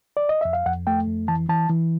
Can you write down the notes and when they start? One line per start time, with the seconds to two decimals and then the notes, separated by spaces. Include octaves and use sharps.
0.17 D5
0.29 D#5
0.41 F2 E5
0.53 F5
0.66 F2 F#5
0.87 A3 G5
1.07 F2
1.28 E3 A5
1.49 E3 A5
1.69 E3